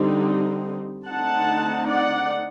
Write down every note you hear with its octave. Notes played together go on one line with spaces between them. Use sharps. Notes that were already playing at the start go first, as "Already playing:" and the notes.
Already playing: D3 G3 C4 D#4
D3 A3 C4 D#4 F#5 A5
D5 F#5